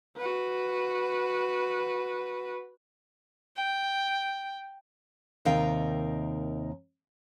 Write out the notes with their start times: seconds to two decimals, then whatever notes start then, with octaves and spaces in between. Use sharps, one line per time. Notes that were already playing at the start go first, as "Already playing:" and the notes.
0.17 F#4 B4
3.56 G5
5.45 D#2 C3 D#4 A#4 F5 G5